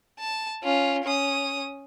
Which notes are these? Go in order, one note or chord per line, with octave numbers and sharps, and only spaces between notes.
A5
C#4 F4
C#4 D#6